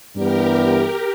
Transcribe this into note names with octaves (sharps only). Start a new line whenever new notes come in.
G2 E3 G3 B3 G4 A#4